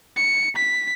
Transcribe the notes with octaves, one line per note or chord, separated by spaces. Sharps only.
C#7
B6